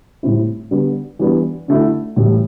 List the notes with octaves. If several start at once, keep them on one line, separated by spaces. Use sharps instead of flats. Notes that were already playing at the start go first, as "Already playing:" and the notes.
A2 G3 C4 E4
D3 G3 B3 D4
E3 G3 B3 D4
D3 A3 E4
A2 E3 G3